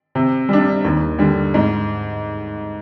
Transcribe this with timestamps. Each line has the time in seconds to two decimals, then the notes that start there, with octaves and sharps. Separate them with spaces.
0.15 C3
0.49 G3 D4
0.84 D#2
1.18 D3 G3
1.54 G#2